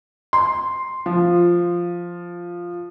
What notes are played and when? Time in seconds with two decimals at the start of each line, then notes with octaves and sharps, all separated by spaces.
0.33 C6
1.06 F3